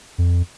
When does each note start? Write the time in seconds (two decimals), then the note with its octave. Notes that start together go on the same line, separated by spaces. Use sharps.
0.18 F2